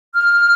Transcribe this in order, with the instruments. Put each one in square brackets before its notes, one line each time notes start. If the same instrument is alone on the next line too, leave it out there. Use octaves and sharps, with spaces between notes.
[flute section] F6